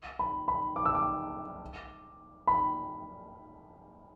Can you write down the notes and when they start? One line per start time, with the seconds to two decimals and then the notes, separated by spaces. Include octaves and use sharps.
0.19 B5
0.48 B5
0.76 D6
0.86 E6
0.95 D6
2.47 B5